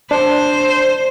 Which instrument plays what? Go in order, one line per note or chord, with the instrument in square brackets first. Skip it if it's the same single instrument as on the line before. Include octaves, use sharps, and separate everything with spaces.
[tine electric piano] D4 [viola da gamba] C5